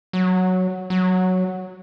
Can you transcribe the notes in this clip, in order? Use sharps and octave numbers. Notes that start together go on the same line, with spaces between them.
F#3
F#3